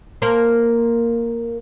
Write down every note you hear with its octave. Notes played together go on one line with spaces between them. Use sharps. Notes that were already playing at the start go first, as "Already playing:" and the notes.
A#3 A#4 C5